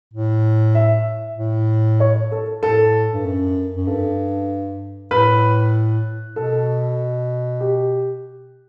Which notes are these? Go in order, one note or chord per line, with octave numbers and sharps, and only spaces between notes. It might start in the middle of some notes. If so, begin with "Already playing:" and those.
A2
E5
A2
C#5
A4
A2 A4
G2
F#2
F#2
G2 A4
A2 B4
B2 A4
G4